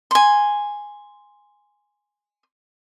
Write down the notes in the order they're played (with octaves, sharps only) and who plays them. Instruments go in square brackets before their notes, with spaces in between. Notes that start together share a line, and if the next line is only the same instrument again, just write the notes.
[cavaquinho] G#5 C6